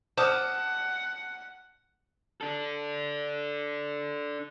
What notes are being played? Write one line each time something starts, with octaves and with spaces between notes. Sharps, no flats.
C5 F#5 A5 D6 D#6 F6
D4 A4